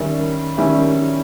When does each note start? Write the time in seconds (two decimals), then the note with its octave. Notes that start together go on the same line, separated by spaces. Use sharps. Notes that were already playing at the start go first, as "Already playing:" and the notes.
Already playing: D#3 G3 C#4 E4
0.57 D#3 G3 C#4 E4